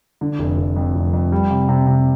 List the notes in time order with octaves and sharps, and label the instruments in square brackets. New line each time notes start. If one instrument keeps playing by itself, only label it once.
[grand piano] D3
F1
F1
F2
F1
F2
G3
C3
C3
C3